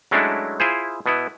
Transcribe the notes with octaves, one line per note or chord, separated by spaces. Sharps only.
F#3 G#3 A3 C#4 D4 E4
E4 F4 G#4 C5
B2 B3 E4